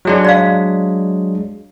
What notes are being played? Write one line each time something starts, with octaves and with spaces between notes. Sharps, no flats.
F#3 G#3 D4
D5 F5